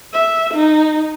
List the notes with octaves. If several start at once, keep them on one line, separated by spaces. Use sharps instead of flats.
E5
D#4